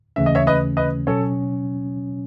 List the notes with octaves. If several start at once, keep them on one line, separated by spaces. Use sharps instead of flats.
D#2 C#3 E3 A3 C#4 E5
D#5
C#5 E5
B4 D#5
B4 D#5
B2 F#3 C#4 A4 C#5